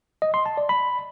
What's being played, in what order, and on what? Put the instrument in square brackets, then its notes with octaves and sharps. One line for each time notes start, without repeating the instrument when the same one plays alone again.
[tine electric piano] D#5
C6
A5
D5
B5